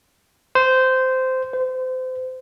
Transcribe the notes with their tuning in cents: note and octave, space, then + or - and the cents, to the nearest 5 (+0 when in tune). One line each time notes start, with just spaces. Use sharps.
C5 -15
C5 -30